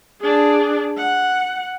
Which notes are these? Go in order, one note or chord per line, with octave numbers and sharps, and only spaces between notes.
D4 G#4
F#5